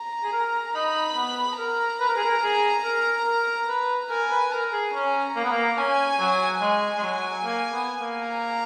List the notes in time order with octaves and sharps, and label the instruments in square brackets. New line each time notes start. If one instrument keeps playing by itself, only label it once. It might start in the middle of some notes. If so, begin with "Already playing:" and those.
Already playing: [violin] A#5
[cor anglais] G#4
A#4
[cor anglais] D#4 [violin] B5
[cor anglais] B3
[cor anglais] A#4 [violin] A#5
[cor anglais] B4
A#4
G#4
A#4
G#4
A#4
A#4
B4
[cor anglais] A#4 [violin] G#5
[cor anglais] B4
[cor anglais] A#4 [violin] A#5
[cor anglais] G#4
[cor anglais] C#4 [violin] A#5
[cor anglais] A#3
B3
A#3
[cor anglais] C#4 [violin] G#5
[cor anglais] F#3
[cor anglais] G#3 [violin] G#5
[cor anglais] G#3
F#3
A#3
B3
A#3
[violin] A#5